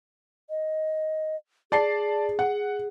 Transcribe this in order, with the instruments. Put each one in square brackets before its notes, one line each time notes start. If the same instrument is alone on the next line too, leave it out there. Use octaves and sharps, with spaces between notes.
[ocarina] D#5
[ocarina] G#4 [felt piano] D5 A5 C7
[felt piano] F#5